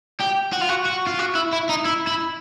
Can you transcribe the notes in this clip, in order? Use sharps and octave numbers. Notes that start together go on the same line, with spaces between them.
G4
F#4
F4
F#4
F#4
F4
F#4
E4
E4
D#4
E4
E4